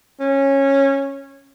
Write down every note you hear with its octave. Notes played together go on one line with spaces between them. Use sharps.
C#4